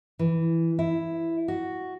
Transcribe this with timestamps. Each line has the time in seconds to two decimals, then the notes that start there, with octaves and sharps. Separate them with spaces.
0.19 E3
0.79 E4
1.48 F#4